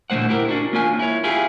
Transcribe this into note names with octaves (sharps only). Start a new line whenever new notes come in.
A#2 D3 F#3 A3 C5 F#5
E4 G4 A#4
C#4 D4 F#4
A#3 C#4 F4 G#5
E4 C#5
E4 F4 G4 G#4 E5 F5